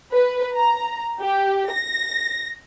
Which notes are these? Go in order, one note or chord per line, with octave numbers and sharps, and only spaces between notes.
B4
A#5
G4
A#6